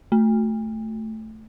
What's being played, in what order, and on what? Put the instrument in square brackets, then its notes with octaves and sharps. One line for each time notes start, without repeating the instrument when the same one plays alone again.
[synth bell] A3